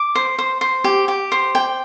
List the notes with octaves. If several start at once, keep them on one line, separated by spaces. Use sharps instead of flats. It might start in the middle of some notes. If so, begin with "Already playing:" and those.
Already playing: D6
C5
C5
C5
G4
G4
C5
G5